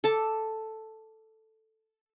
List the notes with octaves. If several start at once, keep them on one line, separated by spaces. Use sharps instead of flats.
A4 A5 D6